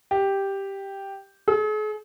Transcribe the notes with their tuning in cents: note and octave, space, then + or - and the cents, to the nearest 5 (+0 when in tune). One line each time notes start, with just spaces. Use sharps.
G4 +0
G#4 +45